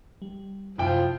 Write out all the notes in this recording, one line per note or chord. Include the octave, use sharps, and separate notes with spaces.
G3
F#2 C3 F3 E4 E5 G5